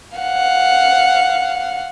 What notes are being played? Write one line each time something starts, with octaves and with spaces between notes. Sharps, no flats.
F5 F#5